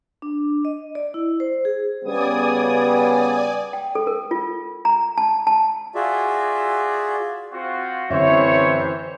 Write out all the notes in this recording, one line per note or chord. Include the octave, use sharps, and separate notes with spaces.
D4
D#5
D5
E4
C5
G#4
C#3 G3 B3 D5 G#5 D#6
G5
A4
A#4
F4
A#5
A5
A5
F4 F#4 G#4 D5 E5
C4 F4 F#4
A1 F#2 D3 E3 C4 C5 C#5 E5